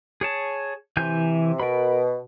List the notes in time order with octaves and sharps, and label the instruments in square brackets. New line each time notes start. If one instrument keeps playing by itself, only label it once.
[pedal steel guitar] G#4 C#5 A5
[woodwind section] C3 [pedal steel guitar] E3 G#5 G6
[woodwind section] B2 [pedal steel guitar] A#4 B5